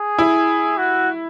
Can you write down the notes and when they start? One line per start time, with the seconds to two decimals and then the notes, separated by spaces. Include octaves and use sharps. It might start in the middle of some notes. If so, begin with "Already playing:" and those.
Already playing: G#4
0.18 E4
0.77 F#4